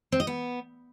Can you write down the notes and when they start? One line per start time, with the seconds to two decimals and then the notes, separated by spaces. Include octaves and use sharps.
0.12 C4
0.20 D#5
0.27 B3